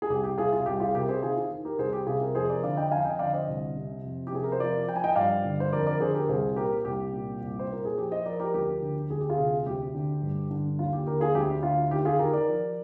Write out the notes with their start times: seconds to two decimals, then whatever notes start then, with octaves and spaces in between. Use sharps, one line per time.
0.02 G#4
0.10 C2 G4
0.24 G4
0.38 C3 F4 G#4
0.52 F4
0.66 C2 G4
0.80 F4 G#4
0.94 C3 G4 A#4
1.08 G#4 C5
1.22 D#3 F4 G#4
1.36 F4
1.50 D#3
1.65 G4 A#4
1.78 C2 G#4 C5
1.93 G4
2.07 C3 F4 G#4
2.21 G4 A#4
2.35 F2 G#4 C5
2.49 A#4 D5
2.63 D3 D5 F5
2.77 D#5 G5
2.91 F2 F5 G#5
3.05 D#5 G5
3.19 D3 D5 F5
3.33 C5 D#5
3.48 C2
3.76 C3
4.04 F2
4.27 G4
4.32 C3 G#4
4.44 A#4
4.52 C5
4.60 F3 A#4 D5
4.88 F3 G5
4.96 G#5
5.04 D#5 G5
5.16 G2 D5 F5
5.44 D3
5.60 C5
5.73 F2 A#4 D5
5.86 A#4 D5
6.00 D3 G#4 C5
6.14 G4 A#4
6.28 C2 G#4 C5
6.56 A#2 G4 A#4
6.85 C2 G4
7.13 A#2
7.41 C2
7.59 C5
7.70 A#2 A#4
7.85 G#4
7.98 F3 G4
8.11 C5 D#5
8.25 F3 A#4 D5
8.40 G4 A#4
8.53 D2 G4 A#4
8.82 D3
9.10 D2 G#4
9.20 G4
9.30 F4 G#4
9.38 C3
9.66 D2 G4
9.94 D3
10.22 G2
10.50 D3
10.79 D#2 F4
10.93 G4
11.06 D3 G4 A#4
11.21 F4 G#4
11.35 D2 G4
11.63 D3 F4
11.91 D#3 G4
12.05 F4 G#4
12.19 D#3 G4 A#4
12.33 A#4 D5
12.48 F3